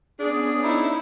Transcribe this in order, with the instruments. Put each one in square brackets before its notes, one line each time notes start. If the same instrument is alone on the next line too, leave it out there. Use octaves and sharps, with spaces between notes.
[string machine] B3 C#4 [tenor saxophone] D4 [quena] G#4
[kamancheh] D#4 E4